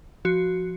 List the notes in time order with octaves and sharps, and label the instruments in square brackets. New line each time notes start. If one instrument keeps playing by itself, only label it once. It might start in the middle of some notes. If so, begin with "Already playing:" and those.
[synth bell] F3 F#4